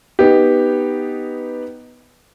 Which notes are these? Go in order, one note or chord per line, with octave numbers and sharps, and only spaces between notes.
B3 D#4 G4